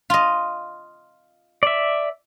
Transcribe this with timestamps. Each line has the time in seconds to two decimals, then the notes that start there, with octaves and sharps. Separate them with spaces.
0.10 F4 D#5
1.63 D5 E5